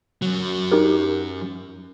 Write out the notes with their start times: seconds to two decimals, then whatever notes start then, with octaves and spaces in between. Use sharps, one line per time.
0.22 F#2 F#3
0.72 D#4 G4 A#4